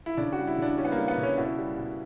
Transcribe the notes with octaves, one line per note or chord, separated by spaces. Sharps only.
E4
C#3 D4
F#4
G3
E4
C#3 D4
G3 C#4
B3
A#3
G3
B3
C#3
C#4
B2 E4
G3
B2